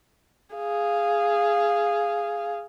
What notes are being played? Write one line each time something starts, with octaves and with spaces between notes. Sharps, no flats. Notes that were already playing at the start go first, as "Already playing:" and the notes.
G#4 F5